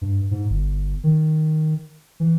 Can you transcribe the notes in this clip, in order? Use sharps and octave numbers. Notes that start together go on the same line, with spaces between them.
G2
G#2
G1
D#3
E3